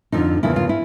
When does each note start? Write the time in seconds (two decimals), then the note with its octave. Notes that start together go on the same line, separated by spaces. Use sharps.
0.12 F2 D3 F3 D#4
0.43 E2 C#3 F3 A#3 E4
0.56 F4
0.69 E4